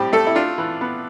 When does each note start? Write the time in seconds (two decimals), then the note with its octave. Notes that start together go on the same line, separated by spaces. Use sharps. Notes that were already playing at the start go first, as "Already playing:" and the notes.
Already playing: A2 G3 C4 G4
0.13 A3 A4
0.27 E4
0.35 D4 F4
0.58 E3
0.81 B3